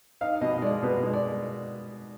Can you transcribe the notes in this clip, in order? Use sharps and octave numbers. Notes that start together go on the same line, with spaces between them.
D#4 F5
B2 D#5
G#3 D5
B2 B4
G#3
D5